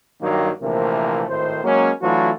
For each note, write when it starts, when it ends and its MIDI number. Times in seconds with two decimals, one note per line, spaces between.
0.21 0.50 43
0.21 0.50 51
0.21 0.50 54
0.21 0.50 58
0.62 1.24 34
0.62 1.24 48
0.62 1.24 52
0.62 1.24 57
0.62 1.24 58
0.62 1.24 70
1.29 1.58 32
1.29 1.58 45
1.29 1.58 51
1.29 1.58 72
1.64 1.91 54
1.64 1.91 56
1.64 1.91 58
1.64 1.91 61
2.02 2.31 52
2.02 2.31 54
2.02 2.31 57
2.02 2.31 62
2.02 2.31 65
2.02 2.31 66